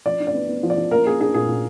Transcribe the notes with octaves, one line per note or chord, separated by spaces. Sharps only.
F3 D5
D4
D5
B3
B3
F3
D5
F3
A#3 A#4
A#3 G#4
D4 G#4
A#2 G#4
A#2